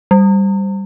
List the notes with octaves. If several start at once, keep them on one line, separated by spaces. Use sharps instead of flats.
G3